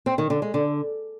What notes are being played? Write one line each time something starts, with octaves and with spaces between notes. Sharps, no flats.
C4
D#3
D3
G#3
D3